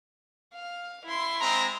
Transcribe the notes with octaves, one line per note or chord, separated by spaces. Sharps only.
F5
E4 C6
G#3 C4 A#5